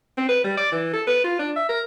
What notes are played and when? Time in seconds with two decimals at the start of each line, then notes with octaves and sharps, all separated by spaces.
0.17 C4
0.29 B4
0.44 G3
0.57 D5
0.72 E3
0.93 A4
1.07 B4
1.24 F4
1.39 D4
1.56 E5
1.69 A#4